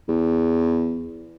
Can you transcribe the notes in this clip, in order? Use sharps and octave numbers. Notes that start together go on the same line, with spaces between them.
E2